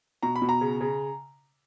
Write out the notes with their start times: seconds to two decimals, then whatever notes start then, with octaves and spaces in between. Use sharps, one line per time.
0.23 B2 A#5
0.36 B5
0.42 B2
0.49 A#5
0.61 C#3
0.81 C#3